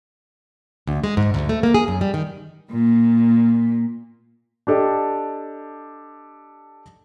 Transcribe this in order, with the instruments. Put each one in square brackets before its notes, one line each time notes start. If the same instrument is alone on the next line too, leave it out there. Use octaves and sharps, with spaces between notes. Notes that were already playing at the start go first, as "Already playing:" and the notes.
[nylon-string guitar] D2
G#3
G#2
D2
A3
A#3
G#4
F#2
G3
D#3
[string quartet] A#2
[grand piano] D4 G4 A4 D#5